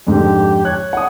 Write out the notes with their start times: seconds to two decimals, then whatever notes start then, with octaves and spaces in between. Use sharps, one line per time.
0.07 F2 G#2 D3 G4
0.65 C#5 F#6
0.93 F#5 D#6